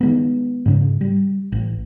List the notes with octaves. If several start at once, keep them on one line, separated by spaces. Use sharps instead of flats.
D#3 G#3 B3
G#2 C#3 G#3
G3
A1